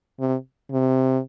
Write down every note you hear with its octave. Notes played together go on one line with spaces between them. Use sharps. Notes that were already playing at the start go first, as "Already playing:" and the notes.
C3
C3